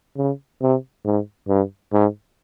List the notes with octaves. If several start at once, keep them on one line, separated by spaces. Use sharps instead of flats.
C#3
C3
G#2
G2
G#2